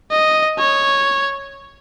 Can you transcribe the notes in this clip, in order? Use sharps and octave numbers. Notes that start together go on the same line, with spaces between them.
D#5
C#5